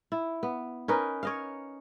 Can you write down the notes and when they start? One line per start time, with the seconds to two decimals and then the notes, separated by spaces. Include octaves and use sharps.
0.12 E4
0.43 B3
0.88 C#4 D#4 A#4 B4
1.23 C#5 D#5 F5